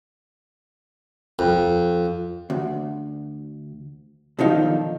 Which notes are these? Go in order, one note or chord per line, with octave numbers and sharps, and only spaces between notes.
F2
D2
B1 D3 D#3 F3 D#4 F5